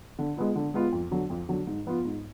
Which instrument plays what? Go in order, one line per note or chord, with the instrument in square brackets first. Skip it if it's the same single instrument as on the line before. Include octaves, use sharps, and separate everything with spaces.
[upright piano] D3
G#3 B3 F4
D3
G#3 B3 F4
F2
D3 F#3
F2
D3 F#3
G#2
F3 B3 F4
G#2